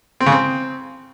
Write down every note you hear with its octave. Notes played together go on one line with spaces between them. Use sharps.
C4
C#3
C4